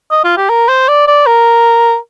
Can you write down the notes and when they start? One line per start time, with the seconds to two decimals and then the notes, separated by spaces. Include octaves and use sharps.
0.12 D#5
0.24 F4
0.37 G4
0.49 A#4
0.68 C5
0.88 D5
1.07 D5
1.26 A#4